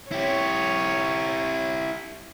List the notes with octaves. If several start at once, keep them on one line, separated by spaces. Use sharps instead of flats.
E4 G4 C#5